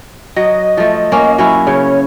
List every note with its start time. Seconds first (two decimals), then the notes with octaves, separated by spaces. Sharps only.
0.36 F#3 D#5
0.77 F3 A3
1.12 A#3 C#4
1.38 F#3 C#4 E4
1.67 C#3 C#5